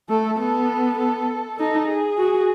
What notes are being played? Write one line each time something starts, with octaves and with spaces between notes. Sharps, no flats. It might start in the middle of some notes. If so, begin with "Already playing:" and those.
A3 A4
B3 A4
A4
D#4 A4
G#4
F#4